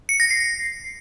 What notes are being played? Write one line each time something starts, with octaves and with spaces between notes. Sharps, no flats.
C#7
A#6
C7